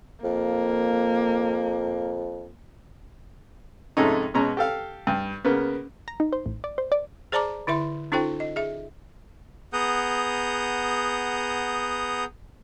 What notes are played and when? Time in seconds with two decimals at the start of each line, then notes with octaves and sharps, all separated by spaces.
0.24 F2 A#3
3.97 F2 G#2 C3 A3 C#4 D#4
4.34 B2 G#3 C#4 A#5
4.57 G4 A4 F5
5.07 G2
5.44 C#3 A#3 B3
6.08 A#5
6.20 D#4
6.33 C5
6.46 A1
6.64 D5
6.78 C5
6.92 D5
7.32 G#4 C5 D5 A5 A#5 D6
7.67 D3 E4 E5 C6
8.12 C#4 D#4 F4 A4 C5 G5
8.40 D#5
8.56 G#4 E5
9.73 B3 G#4 F#5 A#5 D#6 G6